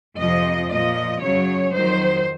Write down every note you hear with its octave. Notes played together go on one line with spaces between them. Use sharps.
F2 C3 F3 D#5
A#2 F3 D#5
F#2 C#3 F#3 C#5
F2 D#3 F#3 C5